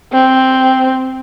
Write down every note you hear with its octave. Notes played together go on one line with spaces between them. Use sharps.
C4